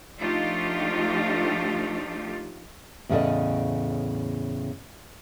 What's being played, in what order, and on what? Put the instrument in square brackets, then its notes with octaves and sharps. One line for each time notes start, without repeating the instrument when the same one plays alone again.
[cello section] F3 A3 D4 D#4 F4 G4
[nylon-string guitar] E2 A2 C#3 A4 D5 D#5